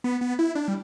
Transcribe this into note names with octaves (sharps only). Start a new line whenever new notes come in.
B3
B3
E4
D4
G3